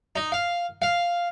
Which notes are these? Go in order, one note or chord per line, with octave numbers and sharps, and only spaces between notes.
D#4
F5
F5